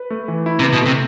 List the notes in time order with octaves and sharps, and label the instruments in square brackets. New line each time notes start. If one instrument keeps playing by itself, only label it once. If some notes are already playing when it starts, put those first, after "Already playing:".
Already playing: [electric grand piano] B4
A3
E3
E4
[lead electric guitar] C3
[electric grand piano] B4
[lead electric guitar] B2
[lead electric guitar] C3 [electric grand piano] A3